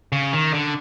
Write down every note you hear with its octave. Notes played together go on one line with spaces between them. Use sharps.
C#3
D#3
D3